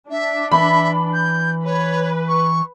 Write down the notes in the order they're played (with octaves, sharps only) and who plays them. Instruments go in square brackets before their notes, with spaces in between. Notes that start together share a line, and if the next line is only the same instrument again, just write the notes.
[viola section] D4 [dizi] E5
[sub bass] E3 [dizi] E5 [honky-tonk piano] B5
[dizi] G6
[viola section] B4 [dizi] C#5
[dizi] C#6